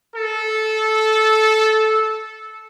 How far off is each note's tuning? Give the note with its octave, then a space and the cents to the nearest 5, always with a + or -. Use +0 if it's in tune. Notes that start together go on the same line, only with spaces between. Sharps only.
A4 -15